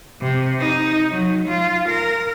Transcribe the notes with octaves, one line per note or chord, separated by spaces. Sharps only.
C3
D#4
F#3
F4
A#4